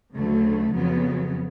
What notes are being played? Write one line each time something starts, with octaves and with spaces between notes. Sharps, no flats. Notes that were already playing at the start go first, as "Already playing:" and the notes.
D2 C#3 F#3 A3
F2 C#3 F#3 B3